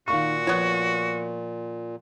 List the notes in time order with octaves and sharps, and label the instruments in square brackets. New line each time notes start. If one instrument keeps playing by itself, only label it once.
[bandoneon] A#2 [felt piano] D#3 F5 C#6 [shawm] F#4
[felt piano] F3 [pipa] B3 C#5